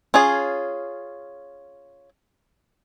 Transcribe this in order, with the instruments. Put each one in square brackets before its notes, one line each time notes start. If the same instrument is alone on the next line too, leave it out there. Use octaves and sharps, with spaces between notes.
[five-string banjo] C#4 F4 G#4